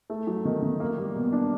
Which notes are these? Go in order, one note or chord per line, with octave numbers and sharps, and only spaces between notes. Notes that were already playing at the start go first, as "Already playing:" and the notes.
A3
F#3
D#3
D#3
A#3
G3
B2
D4